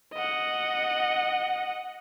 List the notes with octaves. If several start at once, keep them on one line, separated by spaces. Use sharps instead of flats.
D#5 F#5